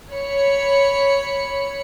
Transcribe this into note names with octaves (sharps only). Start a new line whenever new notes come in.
C#5 B5 C#7